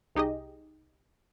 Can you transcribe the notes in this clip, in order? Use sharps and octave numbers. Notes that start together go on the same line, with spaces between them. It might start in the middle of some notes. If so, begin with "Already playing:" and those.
C2 D#4 G4 G#4 D#5